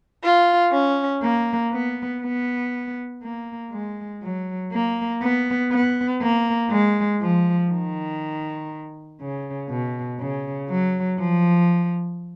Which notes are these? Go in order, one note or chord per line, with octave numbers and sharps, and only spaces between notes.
F4
C#4
A#3
B3
B3
A#3
G#3
F#3
A#3
B3
B3
A#3
G#3
F3
D#3
C#3
B2
C#3
F#3
F3